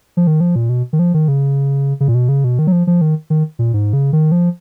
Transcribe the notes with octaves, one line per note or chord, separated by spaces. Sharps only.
F3
D#3
F3
A#2
B2
D#3
F3
D#3
C#3
C#3
A#2
B2
C#3
B2
D#3
F#3
F3
F3
D#3
D#3
A#2
G#2
C#3
D#3
F3